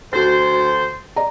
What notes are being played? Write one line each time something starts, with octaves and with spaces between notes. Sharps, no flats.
D2 F#4 A4 C5 A6
D5 A#5